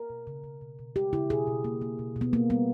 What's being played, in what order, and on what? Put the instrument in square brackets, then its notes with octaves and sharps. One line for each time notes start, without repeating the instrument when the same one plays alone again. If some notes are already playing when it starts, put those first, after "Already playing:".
Already playing: [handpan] A#4
B2
C#3
C#3
B2
B2
G#3 G4
C#3 E4
B2 G#4
B2
A#3
A#3
B2
B2
B3
A#3
G3 B3